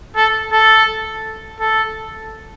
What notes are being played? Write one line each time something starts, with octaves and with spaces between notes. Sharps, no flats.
A4
A4
A4